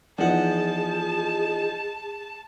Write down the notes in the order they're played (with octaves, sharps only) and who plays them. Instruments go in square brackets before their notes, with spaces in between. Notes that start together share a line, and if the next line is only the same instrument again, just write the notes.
[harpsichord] E2 F#5 [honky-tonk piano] F3 D#4 [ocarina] G#4 [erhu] A5